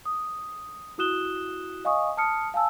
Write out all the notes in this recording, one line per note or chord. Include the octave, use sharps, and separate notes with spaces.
D#6
E4 F#4 D#6 F#6 E7 G7
D#5 F5 G#5 C#6 D#6
A5 D#6 F6 C#7
F5 G#5 A5 E6